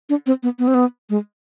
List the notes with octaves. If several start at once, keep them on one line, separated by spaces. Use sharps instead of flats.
D4
C4
B3
B3
C4
B3
G#3